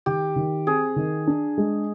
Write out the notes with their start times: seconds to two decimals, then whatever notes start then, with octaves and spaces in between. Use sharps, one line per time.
0.06 D#3 G4
0.36 D#3
0.67 C4 G#4
0.96 D#3
1.27 D4
1.58 G#3